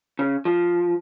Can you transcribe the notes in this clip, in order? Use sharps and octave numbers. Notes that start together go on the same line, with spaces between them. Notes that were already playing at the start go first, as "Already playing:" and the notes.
C#3
F3